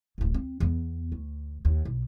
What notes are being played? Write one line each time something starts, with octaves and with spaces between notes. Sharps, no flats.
D1 A1
C4
E2 B3
D2
D#2
B1